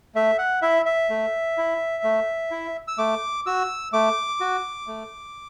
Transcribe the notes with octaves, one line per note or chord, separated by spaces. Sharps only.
A3 E5
F#5
E4 E5
E5
A3
E4
A3
E4
E6
A3 D6
F#4 E6
A3 D6
F#4
A3